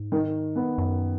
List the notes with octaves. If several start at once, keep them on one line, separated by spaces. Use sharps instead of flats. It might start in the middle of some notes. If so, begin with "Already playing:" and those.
Already playing: G#2
D#3
B3
F#2